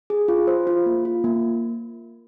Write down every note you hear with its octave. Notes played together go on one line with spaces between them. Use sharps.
G#4
F4
C5
F4
A#3
F4
A#3